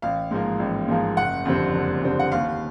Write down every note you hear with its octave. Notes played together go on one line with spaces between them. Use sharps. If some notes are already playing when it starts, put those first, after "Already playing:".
A1 F5
G#2 F3 A#3
A1
G#2 F3 A#3
F#1 F#5
F2 D3 G3 C4
F#1
F2 D3 G3 C4
F#5
D#2 F5